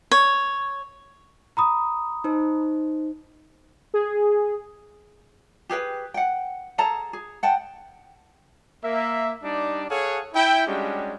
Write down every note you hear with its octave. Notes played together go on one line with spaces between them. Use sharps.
C#5
A#5 B5 D#6
D#4 C5
G#4
G4 G#4 B4 G5
F#5 G5
G#4 A4 A5 A#5
G#4
F#5 G5 A5
A#3 E5
G3 D4 D#4 D5
G#4 A4 C#5 F5 F#5
E4 G5
G3 G#3 C#4 D4 F#4 G4